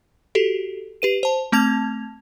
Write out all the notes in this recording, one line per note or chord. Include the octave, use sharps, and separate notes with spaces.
F#4 G4 A4
G4 B4 D#7
C5 A5
A3 C4 A5 G#6 F7